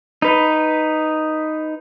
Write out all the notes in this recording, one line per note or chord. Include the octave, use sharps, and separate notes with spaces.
D#4 B4